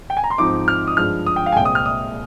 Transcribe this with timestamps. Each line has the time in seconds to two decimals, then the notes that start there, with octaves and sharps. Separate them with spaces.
0.10 G5
0.17 G#5
0.24 A#5
0.30 C6
0.38 G#2 F3 C4 D#4 D6
0.68 F6
0.87 D#6
0.97 G2 F3 G#3 F6
1.27 D#6
1.36 G5
1.46 F5
1.52 G#5
1.56 C2 A#2 G#3 C4 G5
1.65 D#6
1.75 F6
1.86 D#6